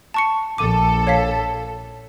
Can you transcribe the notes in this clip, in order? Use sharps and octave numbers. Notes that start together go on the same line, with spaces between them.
A5 C#6 C#7
A#1 A4 D6 D#7
C#5 F5 B6